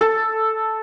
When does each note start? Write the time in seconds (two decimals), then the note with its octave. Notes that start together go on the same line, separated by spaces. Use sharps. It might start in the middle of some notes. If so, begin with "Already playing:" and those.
0.01 A4